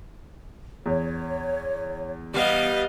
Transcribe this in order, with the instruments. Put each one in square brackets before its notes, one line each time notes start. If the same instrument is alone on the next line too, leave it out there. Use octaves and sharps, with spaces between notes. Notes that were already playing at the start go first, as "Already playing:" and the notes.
[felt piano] E2 [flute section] C#5
[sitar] G3 B3 [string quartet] D#5 F5